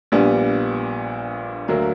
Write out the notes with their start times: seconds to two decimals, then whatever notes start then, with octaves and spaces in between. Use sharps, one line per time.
0.12 A#1 A#2 G3 B3 D4
1.68 D2 D3 F#3 A#3